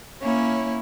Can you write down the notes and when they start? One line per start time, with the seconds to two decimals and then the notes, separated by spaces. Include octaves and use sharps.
0.23 A#3 C#4 E4 C#5